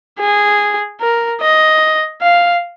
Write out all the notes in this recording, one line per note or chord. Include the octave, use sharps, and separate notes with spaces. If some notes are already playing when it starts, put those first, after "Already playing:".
G#4
A#4
D#5
F5